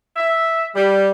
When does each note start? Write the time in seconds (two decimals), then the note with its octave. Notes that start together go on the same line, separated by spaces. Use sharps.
0.17 E5
0.74 G3